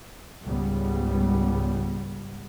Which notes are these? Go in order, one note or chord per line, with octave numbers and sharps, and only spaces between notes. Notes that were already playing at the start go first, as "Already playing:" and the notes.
C#2 G#2 C#3 G3 B3